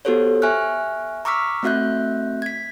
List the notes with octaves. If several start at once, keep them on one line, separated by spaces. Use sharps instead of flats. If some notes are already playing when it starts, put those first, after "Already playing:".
B3 F#4 G4 A4 C5 C#5
E5 G#5 C#6 F6 F#6
A#5 C#6 D6 E6 F6 B6
A3 C4 F#4 E5 F#6 G6
G#6 B6